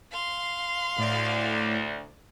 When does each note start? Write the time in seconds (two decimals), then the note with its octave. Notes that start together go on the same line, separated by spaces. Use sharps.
0.12 F5 C6
0.98 D2 A2 D5